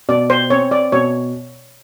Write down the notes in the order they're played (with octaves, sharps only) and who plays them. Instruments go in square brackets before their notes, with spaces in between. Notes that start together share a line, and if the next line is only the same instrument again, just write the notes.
[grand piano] B2 [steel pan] D5
[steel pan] C5
[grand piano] C4 [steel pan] C#5
[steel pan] D5
[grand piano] B2 [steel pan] C#5